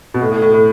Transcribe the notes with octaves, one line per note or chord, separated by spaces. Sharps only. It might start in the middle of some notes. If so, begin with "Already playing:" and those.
B2
A2
A2
A2
A2